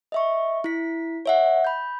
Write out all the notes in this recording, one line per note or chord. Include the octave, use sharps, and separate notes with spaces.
D#5 E5 C#6
E4 B6
C#5 E5 F#5
B5 G6